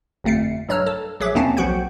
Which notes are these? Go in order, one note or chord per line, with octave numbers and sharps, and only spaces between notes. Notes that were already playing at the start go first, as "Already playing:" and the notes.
G1 F2 A3 C7 C#7
B1 G2 C#5 A#5 E6 F6
A4 A5
A#1 F#3 G#4 E5 D6
D#2 B2 A#3 C4 C#4 A5
B1 F3 F#4 F#5 G5 G6